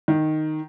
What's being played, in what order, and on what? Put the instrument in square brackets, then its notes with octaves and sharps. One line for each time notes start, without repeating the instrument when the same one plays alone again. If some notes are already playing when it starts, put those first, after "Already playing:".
[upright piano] D#3